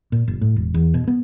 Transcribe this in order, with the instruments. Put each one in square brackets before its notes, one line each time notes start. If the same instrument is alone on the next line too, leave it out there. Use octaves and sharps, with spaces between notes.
[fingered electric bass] A#2
F#1
A2
E1
E2
B2
B3